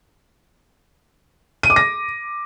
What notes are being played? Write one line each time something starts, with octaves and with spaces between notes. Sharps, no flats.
D#7
D6
A#6